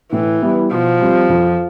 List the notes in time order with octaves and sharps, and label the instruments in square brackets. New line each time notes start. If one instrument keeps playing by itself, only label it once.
[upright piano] A2 [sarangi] E3
[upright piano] G3 B3 E4
[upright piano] B2 [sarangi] F3
[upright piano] G3 C4 G4
F2